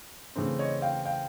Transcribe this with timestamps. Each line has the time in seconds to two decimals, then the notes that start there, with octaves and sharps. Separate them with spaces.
0.36 C#3 E3 A3 C4
0.59 C#5 D#5
0.82 F5 G5
1.05 F5 G5